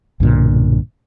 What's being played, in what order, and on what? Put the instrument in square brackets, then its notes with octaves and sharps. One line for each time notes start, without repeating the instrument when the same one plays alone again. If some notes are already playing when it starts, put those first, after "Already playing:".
[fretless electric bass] B1 G2 A#2 D3